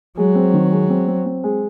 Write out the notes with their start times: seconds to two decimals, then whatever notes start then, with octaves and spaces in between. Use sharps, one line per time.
0.17 F#3 G#3
0.35 C4
0.54 D#3
0.72 G#3
0.90 C4
1.08 C4
1.26 C4
1.44 G#3